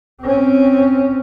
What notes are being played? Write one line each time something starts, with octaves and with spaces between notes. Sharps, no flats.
C4 C#4